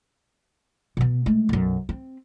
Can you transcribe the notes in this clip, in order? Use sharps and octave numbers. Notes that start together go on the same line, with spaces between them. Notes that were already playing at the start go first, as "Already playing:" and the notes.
B2 B3
G#3 A3
B1 F#2
C4